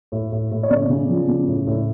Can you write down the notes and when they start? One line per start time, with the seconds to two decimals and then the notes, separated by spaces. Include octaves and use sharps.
0.12 A2
0.32 A2
0.51 A2
0.63 C#5
0.70 C#3 D5
0.90 C#3
1.09 F3
1.28 C#3
1.48 A2
1.67 A2